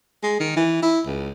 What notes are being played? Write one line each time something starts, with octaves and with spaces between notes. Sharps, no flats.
G#3
D#3
E3
E4
C#2